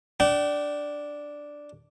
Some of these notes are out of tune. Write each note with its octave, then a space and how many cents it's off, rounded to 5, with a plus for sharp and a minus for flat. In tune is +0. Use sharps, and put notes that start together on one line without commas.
D4 +0 G5 -35